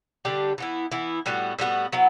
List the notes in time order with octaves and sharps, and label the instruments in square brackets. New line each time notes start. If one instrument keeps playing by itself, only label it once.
[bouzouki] D3 G3 D4 G4
E3 B3 E4
E3 B3 E4
A2 G3 B3 F#4
A2 G3 B3 F#4
F#3 B3 E4